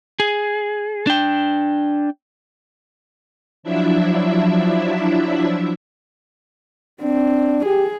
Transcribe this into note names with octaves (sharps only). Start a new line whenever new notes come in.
G#4
D4 G5
F3 F#3 D4 E4 E5
C4 D4
G4 G#4